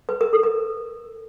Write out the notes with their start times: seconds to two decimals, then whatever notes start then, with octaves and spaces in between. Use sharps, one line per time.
0.09 B4
0.21 A#4
0.33 A4
0.43 A#4